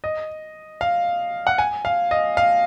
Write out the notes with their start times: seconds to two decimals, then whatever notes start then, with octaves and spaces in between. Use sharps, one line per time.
0.04 D#5
0.81 F5
1.47 F#5
1.58 G#5
1.85 F5
2.11 D#5
2.37 F5